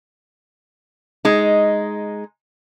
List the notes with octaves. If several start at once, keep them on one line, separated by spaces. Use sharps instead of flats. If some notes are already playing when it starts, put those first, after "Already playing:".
G#3 D#4